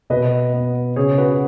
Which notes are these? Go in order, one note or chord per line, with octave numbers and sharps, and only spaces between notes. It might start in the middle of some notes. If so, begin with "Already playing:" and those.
B2 B4 D#5
B3
C#3 G#4 C#5
F#4 B4